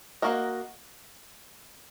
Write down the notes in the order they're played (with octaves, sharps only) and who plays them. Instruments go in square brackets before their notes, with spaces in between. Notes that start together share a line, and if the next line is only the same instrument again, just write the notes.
[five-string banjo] A#3 D4 F#4 A#4 D#5